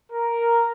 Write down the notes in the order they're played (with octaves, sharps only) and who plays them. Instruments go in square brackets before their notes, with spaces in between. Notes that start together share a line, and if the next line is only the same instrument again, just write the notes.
[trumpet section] A#4